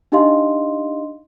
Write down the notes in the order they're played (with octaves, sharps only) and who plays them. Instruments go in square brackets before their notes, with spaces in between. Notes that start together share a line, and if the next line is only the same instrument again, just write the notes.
[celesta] D4 D#4 G4 D#5 F5 C6